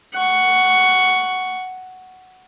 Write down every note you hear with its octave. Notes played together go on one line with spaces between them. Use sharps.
F#5 C#6